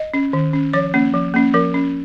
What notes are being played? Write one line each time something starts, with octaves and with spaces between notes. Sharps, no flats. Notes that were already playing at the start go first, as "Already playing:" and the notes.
Already playing: D#5
C#4
D#3
C#4
F3 C#5
A#3 C#4
F3
A#3 C#4
F3 A#4
C#4